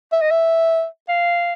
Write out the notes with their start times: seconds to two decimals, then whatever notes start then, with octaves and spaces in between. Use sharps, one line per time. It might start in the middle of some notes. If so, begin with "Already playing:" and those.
0.12 E5
0.22 D#5
0.31 E5
1.09 F5